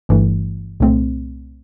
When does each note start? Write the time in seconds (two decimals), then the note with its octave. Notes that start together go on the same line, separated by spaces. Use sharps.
0.09 G1 G2 E3 A3
0.80 C2 A#2 A3 C4